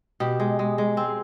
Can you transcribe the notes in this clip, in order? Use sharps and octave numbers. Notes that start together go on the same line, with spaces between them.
B2 G4
G#3
G#3
G#3
C4